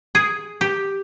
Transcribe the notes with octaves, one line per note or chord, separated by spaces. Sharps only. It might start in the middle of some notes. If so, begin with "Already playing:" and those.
G#4
G4